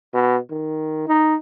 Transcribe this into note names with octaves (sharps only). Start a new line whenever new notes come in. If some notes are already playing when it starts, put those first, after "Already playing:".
B2
D#3
D#4